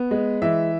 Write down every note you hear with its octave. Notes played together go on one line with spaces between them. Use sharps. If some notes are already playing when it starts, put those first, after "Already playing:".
Already playing: B3
G#3
E3 E5